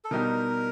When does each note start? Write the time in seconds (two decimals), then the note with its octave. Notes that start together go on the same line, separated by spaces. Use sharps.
0.05 A4
0.11 B2 G3 B3 D#4 G4 A#4